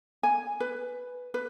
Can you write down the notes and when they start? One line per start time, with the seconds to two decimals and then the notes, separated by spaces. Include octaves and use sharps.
0.23 G#5
0.60 B4
1.34 B4